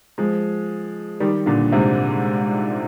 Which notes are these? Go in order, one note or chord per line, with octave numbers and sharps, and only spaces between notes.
F3 G#3
D#3 G3
A#2 D3
G#2 C3